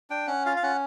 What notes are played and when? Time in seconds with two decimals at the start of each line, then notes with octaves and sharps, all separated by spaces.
0.10 D4 G5
0.27 C#4 F#5
0.46 F4 F5
0.57 F5
0.63 C#4 F#5